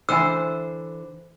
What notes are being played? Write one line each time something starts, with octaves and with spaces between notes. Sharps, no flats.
D3 E3 C5 G#5 E6